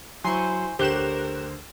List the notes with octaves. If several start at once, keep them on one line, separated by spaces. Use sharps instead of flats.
F#3 E4 C5 G#5 C6 C#6
D2 G4 A#4 C5 C#5 F#6 E7 G7